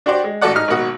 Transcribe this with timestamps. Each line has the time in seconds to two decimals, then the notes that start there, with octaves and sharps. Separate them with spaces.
0.06 D4 F#4 G4 C5 D5
0.24 G#3
0.41 A1 F#4 A4 D5 F#5
0.54 G#2 D#4 F6
0.68 G#1 B2 A#3 F#4 D#6